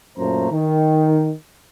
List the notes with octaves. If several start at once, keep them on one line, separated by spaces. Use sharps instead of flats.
F#2 A#2 A3 C5 A#5
D#3